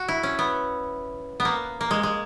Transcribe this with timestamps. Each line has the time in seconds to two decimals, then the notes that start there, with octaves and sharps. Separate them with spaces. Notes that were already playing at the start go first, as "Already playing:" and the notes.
Already playing: F#4
0.08 E4
0.23 C#4
0.39 B3
1.40 B3
1.45 A#3
1.81 A#3
1.91 G#3
2.03 G#3